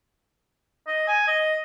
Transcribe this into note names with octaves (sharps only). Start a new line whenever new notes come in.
D#5
G#5
D#5